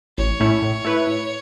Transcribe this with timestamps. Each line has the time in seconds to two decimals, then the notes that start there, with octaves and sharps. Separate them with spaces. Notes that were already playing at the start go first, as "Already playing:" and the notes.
0.18 A1 C#5
0.40 A2 A3 C#4 E4
0.62 A2
0.85 A3 E4 B4
1.07 A2